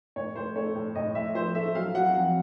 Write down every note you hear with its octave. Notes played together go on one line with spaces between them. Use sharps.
A2 C#5
A2 C5
A3 C#5
A2
A2 D#5
A2 E5
F3 C5
A3 E5
F#3 F5
F#3 F#5
F2 F#5